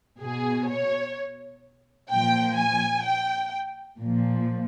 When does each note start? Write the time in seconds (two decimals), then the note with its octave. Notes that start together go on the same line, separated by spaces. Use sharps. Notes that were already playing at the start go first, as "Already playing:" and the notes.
0.21 B2 G#4
0.69 C#5
2.09 A#2 F3 G5
2.56 G#5
3.03 G5
3.97 A#2 F3